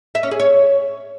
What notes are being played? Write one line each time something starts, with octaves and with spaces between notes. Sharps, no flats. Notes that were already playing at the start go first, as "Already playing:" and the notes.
E5
C#4
G#4
C#5